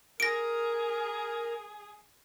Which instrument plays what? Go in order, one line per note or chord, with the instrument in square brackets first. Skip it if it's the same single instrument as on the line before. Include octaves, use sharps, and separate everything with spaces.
[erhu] G#4 [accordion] A#4 [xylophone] A#6 D7